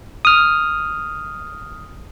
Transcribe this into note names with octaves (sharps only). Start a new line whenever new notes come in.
D#6 F6